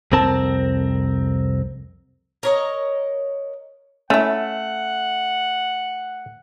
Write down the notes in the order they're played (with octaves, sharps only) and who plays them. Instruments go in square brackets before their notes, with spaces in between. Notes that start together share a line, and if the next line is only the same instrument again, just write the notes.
[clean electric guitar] C2 F2 C4 A#4 A5
[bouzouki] A#4 C#5 D#5
[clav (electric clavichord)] A3 [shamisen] C#4 E4 [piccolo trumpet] F#5